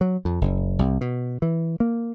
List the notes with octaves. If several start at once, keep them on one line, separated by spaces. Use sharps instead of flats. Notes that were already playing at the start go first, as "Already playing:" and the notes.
F#3
F2
F#1
C2
B2
E3
A#3